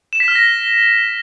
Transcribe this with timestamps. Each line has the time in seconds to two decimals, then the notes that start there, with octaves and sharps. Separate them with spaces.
0.13 E7
0.20 B6
0.28 F6
0.35 A#6